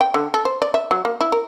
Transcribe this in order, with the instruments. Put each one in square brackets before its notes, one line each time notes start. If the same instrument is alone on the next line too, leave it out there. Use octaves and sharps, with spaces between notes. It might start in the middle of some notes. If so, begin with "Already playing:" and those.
[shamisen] G5
D3
A4
C5
D5
E5
F#3
A#3
E4
A#4